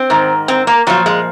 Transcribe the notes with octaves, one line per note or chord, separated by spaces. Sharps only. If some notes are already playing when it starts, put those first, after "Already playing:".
Already playing: C4
G#2 D#3
C4
A#3
A#2 F3 F#3
G#3